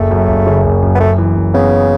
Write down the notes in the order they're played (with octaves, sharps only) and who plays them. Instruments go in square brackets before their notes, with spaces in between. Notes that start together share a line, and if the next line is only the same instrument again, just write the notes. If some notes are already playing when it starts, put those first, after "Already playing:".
Already playing: [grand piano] F#1 [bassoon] A3
[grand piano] F#2
F#1
C#3
F#1
F#2
[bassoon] B3
[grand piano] F#2 [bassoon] A3
[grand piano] E3
F#2
[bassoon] C#3 [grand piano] B3